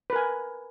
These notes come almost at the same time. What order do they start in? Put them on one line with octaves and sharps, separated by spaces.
B4 A#4 G#5